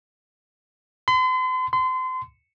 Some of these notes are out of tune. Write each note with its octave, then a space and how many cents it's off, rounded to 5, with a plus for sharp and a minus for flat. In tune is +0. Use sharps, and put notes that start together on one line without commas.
C6 -40
C6 -30